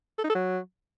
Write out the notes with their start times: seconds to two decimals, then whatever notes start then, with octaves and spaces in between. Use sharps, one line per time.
0.18 A4
0.24 D#4
0.29 A4
0.35 F#3